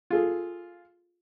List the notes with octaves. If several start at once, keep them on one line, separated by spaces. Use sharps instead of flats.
F4 G#4 A4